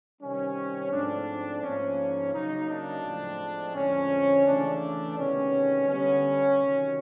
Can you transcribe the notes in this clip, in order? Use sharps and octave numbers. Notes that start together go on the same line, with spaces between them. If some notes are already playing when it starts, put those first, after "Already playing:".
C3 D#3 G3 C4 C#4
G#2 F3 A3 C4 D4
G#2 F3 A#3 C#4
C#3 F#3 A#3 D#4
D4
A2 F3 G#3 C4
F2 D3 F3 G#3 C4 C#4
C#3 E3 A3 D4
C3 D#3 G#3 B3 C#4
D3 G3 B3 C#4
C3 D#3 F#3